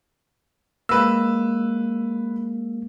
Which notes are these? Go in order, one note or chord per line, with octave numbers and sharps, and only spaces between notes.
G#3 A#3 B4 E6